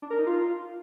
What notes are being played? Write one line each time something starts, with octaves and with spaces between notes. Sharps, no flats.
D4
A#4
D#4
F4